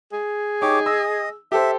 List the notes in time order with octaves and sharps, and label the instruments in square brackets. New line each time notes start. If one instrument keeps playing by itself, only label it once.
[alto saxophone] G#4
[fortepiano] D#4 [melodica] G4 C#5 D6
[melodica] D#5 [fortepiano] E6
[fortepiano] G4 A4 C5 [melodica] E5